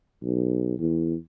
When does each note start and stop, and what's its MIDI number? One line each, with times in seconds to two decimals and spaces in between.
0.23 0.75 35
0.79 1.15 40